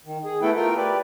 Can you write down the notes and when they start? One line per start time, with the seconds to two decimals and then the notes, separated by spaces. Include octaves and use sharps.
0.05 D#3
0.24 G#4
0.42 A3 B3 E4 A4 B4 G5
0.56 A3 F4 A#4 G5
0.77 G4 B4 D5